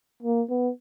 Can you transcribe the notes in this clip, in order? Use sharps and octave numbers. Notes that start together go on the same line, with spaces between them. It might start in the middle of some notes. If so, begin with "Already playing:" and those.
A#3
B3